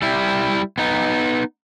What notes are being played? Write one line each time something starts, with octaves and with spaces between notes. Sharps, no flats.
G3 E4
B3 D#4